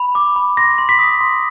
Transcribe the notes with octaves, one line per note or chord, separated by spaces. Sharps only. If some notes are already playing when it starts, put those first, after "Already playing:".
Already playing: B5
D6
B5
C6 A#6
C6
B6
D#6
C6